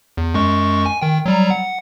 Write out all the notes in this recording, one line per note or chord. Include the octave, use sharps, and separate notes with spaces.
E2
F#2 G#3 C#6
G#5
D#3 G5
F#3 G3 A#5
F#5